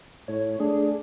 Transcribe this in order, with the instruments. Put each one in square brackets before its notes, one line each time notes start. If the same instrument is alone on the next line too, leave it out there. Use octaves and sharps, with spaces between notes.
[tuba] A2 [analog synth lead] C#5
[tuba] A3 [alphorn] D4 [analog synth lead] G#4